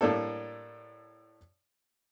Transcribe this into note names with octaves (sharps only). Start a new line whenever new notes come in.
A2 G3 A#3 D4 A4